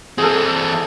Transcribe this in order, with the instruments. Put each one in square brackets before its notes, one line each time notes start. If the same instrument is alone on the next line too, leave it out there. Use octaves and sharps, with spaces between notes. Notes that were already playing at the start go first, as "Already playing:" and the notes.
[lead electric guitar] E3 C4 [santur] G#4 A4